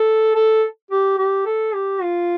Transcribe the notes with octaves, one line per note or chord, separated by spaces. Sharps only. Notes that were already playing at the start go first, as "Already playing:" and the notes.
Already playing: A4
A4
G4
G4
A4
G4
F4